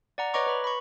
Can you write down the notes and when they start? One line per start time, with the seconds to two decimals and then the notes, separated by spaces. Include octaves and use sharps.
0.18 D5 F#5 A#5
0.34 B4 C#5 D#5 A#5 C#6 D6
0.47 B4 B5
0.64 B5 C#6